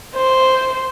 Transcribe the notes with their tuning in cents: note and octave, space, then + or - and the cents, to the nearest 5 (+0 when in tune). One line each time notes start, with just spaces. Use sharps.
C5 -5